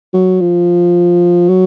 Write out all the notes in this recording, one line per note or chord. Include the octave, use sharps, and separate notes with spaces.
F#3
F3
F#3